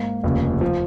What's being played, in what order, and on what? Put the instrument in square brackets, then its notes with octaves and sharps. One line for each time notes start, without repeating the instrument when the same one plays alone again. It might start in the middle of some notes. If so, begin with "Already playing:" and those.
Already playing: [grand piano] G#2 A#3
F1 D#2 C#3 F3
F3